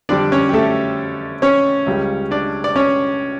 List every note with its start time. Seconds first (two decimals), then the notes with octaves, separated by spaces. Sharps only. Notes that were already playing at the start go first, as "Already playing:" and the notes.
0.09 F2 D3 G3 D4 D5
0.32 C#4 C#5
0.49 G4
0.53 A3 A4
1.42 C#4 C#5
1.87 C#2 C#3 G3
2.31 D4 D5
2.64 D5
2.76 C#4 C#5